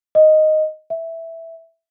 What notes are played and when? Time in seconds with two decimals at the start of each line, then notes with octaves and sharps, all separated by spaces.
0.15 D#5
0.90 E5